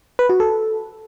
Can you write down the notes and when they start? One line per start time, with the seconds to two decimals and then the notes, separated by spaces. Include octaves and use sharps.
0.19 B4
0.29 F#4
0.40 A4